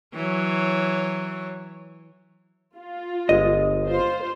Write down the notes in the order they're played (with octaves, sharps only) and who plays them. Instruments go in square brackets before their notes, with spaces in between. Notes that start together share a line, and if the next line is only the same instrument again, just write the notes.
[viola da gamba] E3 F#3 C#5
[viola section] F4
[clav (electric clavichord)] G1 G#3 [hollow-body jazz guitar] D#5
[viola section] F4 C5